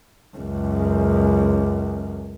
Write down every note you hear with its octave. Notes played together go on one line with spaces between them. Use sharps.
C#2 F#2